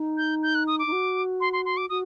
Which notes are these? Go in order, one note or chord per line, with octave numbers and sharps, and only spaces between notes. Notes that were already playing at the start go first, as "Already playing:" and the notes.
Already playing: D#4
G6
G6
F#6
D#6
D6
D#4
F#4
C6
C6
C6
D6
F#4 D#6